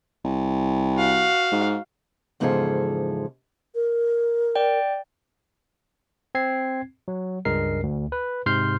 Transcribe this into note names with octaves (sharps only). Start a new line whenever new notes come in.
C2
F#4 F5
G#2
E2 G#2 C#3 F3 G#4 A4
A#4
D5 G5
C4 G#6 C7
F#3
C#2 G2 G#3 A#4 C7
D2
B4
G#2 C3 C6 F6 G6 C7